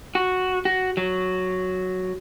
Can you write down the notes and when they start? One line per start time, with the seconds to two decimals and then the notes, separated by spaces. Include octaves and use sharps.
0.15 F#4
0.65 F#4
0.97 F#3